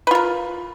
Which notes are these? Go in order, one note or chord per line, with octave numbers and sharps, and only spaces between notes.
F4 A#4 B4